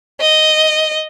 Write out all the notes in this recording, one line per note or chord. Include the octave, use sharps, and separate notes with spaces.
D#5